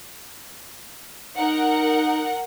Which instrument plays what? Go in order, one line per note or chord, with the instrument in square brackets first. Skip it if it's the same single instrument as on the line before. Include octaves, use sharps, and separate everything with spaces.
[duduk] D#4 [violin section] A#4 F#5